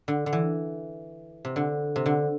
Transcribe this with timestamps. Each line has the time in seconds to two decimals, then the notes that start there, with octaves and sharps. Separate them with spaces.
0.08 D3
0.26 D3
0.33 E3
1.45 C3
1.56 D3
1.96 C3
2.06 D3